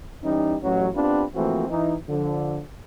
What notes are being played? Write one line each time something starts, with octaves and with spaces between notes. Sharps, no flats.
E3 G3 C#4 D#4
A1 F#3
B3 C4 D4 F4 G4 B4
E3 F3 A3 A#3 C4 F#4
E3 D#4
D3 F3